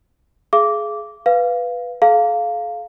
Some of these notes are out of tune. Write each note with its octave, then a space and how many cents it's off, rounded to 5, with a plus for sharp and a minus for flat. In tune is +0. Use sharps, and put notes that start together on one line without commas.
G#4 +20 F5 -35 D6 -15
B4 +0 F5 -5
A4 -40 F5 +0 A#5 -45